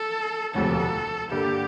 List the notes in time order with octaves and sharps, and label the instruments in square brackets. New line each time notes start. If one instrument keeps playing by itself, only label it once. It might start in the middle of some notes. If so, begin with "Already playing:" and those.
Already playing: [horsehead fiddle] A4
[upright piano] E1 D2 C3 F3 [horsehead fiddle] A4
[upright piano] G2 D3 G3 A#3 [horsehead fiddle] G4